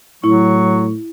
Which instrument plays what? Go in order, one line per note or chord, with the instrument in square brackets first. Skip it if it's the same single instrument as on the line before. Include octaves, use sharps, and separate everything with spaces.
[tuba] A2 [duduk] F#3 [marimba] E4 [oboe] C#6